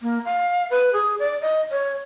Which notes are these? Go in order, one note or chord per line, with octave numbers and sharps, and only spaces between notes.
A#3
F5
B4
G#4
D5
D#5
C#5